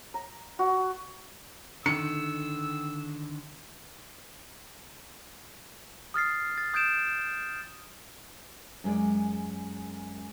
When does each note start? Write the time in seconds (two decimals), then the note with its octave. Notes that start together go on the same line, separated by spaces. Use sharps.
0.14 A#5
0.59 F#4
1.86 D3 D#3 E6 C#7
6.14 D#6 F6 A6 C7
6.58 A6
6.74 D#6 G6 G#6 D7 E7
8.84 F#2 G#3 D5